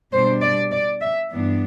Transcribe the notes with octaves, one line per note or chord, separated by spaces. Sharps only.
B2 G3 D4 C5
D5
D5
E5
G2 E3 B3 D4